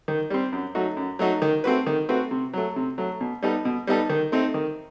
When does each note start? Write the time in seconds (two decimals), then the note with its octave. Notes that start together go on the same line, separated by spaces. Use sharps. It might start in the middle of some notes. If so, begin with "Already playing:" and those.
0.08 D#3
0.30 G3 C4
0.53 F#2
0.75 F#3 A3 D#4 F#4
0.97 F#2
1.19 F#3 A3 D#4 F#4
1.42 D#3
1.64 A3 C4 F#4 B4
1.87 D#3
2.09 A3 C4 F#4 B4
2.31 C3
2.53 F#3 A3
2.76 C3
2.98 F#3 A3
3.21 B2
3.43 G3 B3 D#4 A4
3.65 B2
3.87 G3 B3 D#4 A4
4.10 D#3
4.32 A3 C4 D#4
4.54 D#3